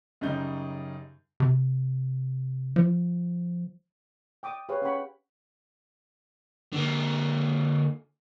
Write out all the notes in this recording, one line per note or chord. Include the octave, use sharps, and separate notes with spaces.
F#2 C#3 G3 D#4 G6
C3
F3
G5 D6 D#6
G4 G#4 B4 C#5 F5
C#4 C#5 F#5 G5 B5 C#6
D3 A#3